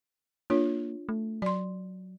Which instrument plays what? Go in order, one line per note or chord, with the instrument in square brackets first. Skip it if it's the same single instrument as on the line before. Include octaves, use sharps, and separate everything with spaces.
[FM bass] A#3 [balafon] D4 F4 C#5
[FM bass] A3
[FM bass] F#3 [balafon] D5 C6